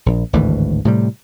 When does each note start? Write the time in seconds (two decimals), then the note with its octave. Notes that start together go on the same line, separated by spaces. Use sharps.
0.06 A#1
0.33 G#1 D2 A2 E3
0.85 A2 C3 G3